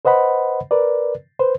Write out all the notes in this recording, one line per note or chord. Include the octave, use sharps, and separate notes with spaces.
B4 C5 D#5 F#5 B5
A#4 B4 D5
B4 C5